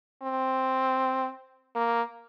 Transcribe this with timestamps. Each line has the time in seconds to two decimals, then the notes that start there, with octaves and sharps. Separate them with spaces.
0.22 C4
1.75 A#3